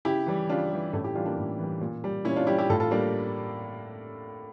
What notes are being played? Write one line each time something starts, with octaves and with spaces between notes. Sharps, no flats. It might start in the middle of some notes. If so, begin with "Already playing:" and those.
C#3 E4 G4
E3 G3
C#3 D4 F4
E3 G3
A2 A3 C#4
E4 G4
E3 G3 D4 F4
A#3 D4
A2
E3 G3
A#2
G3
A#2 C#4 E4
D4 F4
G3 E4 G4
E4 G4
A2 F4 A4
F4 A4
G3 A#3 D4